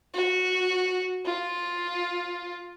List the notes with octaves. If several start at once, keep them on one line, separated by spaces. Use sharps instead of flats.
F#4
F4